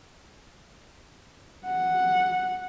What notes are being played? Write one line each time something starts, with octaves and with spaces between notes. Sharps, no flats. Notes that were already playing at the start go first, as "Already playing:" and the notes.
F#5